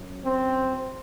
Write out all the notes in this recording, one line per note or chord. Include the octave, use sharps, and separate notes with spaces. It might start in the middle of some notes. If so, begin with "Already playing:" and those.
Already playing: F#2 F#3
C4